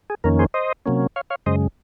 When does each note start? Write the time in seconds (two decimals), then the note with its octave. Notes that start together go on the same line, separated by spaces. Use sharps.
0.10 G#4
0.24 F2 D#3 A#3 C#4 A#4
0.39 G#4 C5
0.54 C5 D#5
0.86 C3 F#3 A#3 C#4
1.16 C#5 F5
1.30 C#5 F5
1.46 F#2 C#3 G#3 C5 D#5